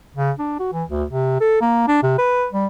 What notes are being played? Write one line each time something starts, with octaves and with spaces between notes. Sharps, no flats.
C#3
D4
F#4
E3
D2
C3
A4
A#3
D4
C3
B4
G3